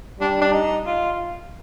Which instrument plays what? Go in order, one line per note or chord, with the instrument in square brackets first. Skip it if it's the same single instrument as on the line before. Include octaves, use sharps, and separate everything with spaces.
[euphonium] G3 [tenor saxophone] D4
[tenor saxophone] D4
D#4
F4